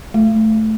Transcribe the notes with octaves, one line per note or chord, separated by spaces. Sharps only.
A3